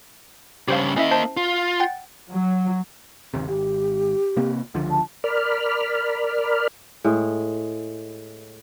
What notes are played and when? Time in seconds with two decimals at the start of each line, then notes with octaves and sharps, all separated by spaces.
0.68 G2 C#3 G4 C5 F5
0.96 A#3 C#4 E4 D#5 E5
1.11 C5 A5 C7
1.37 F4
1.80 F#5 G5 A6
2.29 F#3
3.34 G1 D#2 C3
3.48 G#1 G4
4.36 C3 A#3 C4
4.74 C#2 D3 F3
4.91 A5
5.24 A#4 D5 B5 F6
7.05 A2 G#3